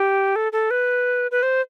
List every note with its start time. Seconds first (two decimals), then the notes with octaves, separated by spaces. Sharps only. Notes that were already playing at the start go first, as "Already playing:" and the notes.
Already playing: G4
0.36 A4
0.52 A4
0.71 B4
1.31 B4
1.43 C5